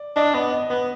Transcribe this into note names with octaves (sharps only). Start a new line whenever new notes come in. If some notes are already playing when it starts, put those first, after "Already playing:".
Already playing: D5
D4 D#5
B3 D#5
D#5
B3 B4